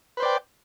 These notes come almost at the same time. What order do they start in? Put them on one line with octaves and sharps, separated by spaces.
B4 C5 D5 G5